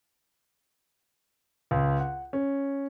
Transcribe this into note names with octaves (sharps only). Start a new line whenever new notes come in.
C#2
F#5
C#4